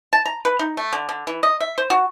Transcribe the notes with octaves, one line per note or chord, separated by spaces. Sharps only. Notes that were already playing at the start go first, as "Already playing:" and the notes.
A5
A#5
B4
D#4
A3
D3
D3
E3
D#5
E5
C5
F#4